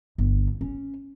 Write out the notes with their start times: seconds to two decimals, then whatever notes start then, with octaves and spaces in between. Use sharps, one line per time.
0.18 G1
0.61 C#4